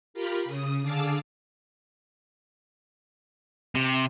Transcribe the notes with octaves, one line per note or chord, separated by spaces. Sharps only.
F4 G4 A#4 B5
C#3 D#6
D3 G#4 F5 A5 D6 E6
C3